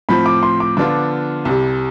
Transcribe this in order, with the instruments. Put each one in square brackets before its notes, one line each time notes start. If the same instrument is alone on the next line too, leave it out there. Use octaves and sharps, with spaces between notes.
[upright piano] A2 F3 C4 [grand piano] B5
[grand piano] D6
C6
D6
[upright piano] D3 F3 B3 D4 F4 [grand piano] D6
[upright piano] C2 C3 G3